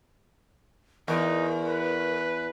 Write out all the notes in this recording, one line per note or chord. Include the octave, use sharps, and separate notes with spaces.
E2 D#4 A#4
B4